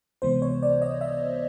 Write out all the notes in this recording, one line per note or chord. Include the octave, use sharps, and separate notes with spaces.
C#2 C3 E3 G#3 B3 C5
C#5
D5
D#5
E5